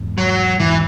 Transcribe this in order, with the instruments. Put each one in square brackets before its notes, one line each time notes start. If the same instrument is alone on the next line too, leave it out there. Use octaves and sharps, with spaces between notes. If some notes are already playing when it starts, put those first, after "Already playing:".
Already playing: [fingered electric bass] E2 G#2
[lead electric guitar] F#3
[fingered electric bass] E2 G#2 [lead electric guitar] E3